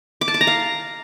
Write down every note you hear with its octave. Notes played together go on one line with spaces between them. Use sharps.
D6
A5
D6
A#5
F5